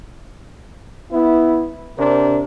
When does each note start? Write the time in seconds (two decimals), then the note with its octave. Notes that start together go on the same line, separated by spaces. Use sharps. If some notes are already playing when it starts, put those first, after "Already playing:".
1.12 B3 E4
1.98 C3 D4 A#4